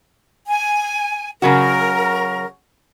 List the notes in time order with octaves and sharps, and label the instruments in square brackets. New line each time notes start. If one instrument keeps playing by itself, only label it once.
[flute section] G#5
[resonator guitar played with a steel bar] C#3 F#3 F#4 [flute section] A#4